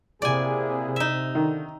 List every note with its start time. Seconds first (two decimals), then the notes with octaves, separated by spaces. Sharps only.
0.22 C3 A#3 E4 G#4 D5 G#5
0.96 D#4 E5
1.35 D3 D#3